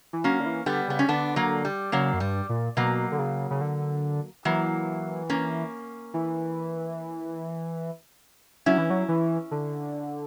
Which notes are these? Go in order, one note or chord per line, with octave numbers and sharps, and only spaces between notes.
E3
F#3 A#3 C#4
D3
E3
D3 G3 B3
C#3 B3
C#4
D3 B3 D4
F#3 A#3
G3
C#3 F#3 A#3
F#2
G2 G3
A#2
B2 F#3 A#3
D3
C#3
C#3
D3
E3 F#3 A#3
A#3 C#4
E3
F#3 C#4 E4
E3
F#3
E3
D3